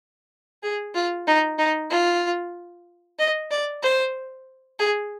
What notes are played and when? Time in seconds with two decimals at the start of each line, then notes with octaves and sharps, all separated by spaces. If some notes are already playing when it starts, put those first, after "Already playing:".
0.63 G#4
0.95 F4
1.27 D#4
1.58 D#4
1.90 F4
3.19 D#5
3.51 D5
3.83 C5
4.79 G#4